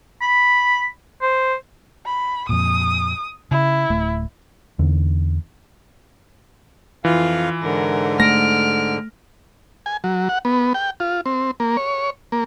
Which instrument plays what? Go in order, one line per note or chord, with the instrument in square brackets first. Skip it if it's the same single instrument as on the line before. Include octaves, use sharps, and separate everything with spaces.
[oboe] B5
C5
[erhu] B5
[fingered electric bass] F2 A#2 [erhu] D#6
[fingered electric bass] C#3 [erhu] E4
[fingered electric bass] D1 A3
[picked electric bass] E2 D3
[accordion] F2 F5 [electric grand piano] E3 [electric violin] F4
[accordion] G#2 D3 [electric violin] A#4
[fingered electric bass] A3 [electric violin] F6 D7 [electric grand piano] A#6
[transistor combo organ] G#5
F#3
F#5
B3
G5
F4
C4
A#3
C#5
A#3